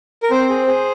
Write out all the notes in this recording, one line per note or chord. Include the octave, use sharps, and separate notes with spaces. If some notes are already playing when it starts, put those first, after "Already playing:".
A#4
C4 C5
G#4
G#4